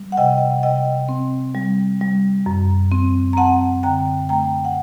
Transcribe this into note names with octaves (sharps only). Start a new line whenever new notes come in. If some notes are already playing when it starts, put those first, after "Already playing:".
Already playing: G3
F#5
C3 D#5 G5
D#5
F#5
C3 D#5 G5
C4
G3
G3
F#2
C4
A#5
C4 F#5 A5
D3 G5 A#5
A3 G5 A#5
F#5